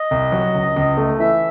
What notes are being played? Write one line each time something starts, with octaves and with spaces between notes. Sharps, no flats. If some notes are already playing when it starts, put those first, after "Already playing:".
Already playing: D#5
C2
F#3
C#2
C#2
A3
E3 E5